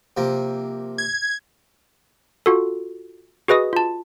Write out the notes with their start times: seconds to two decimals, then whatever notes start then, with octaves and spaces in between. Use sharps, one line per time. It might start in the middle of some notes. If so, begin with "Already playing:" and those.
0.17 C3 F3 A#3
0.98 G#6
2.46 F4 F#4 A4
3.48 F#4 G#4 B4 D#5 D#6
3.73 F4 A5